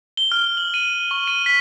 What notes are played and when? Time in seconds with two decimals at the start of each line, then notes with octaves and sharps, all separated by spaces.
0.17 G7
0.32 F6
0.57 F#7
0.74 D#7
1.11 C#6
1.28 D#7
1.46 B6